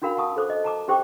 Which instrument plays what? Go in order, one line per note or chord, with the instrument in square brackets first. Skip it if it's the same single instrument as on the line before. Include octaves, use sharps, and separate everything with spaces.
[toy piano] C#4 D4 F#4 A#4 F5 B5
F#5 A5 C#6 D#6
A4 C5 D6
D#5
A5 A#5 D6
C#4 G4 C5 G5 C#6 D6